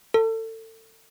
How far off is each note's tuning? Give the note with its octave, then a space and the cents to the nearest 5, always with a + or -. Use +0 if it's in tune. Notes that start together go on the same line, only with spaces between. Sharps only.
A4 +30